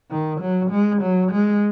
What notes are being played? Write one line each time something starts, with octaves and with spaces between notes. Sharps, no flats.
D#3
F#3
G#3
F#3
G#3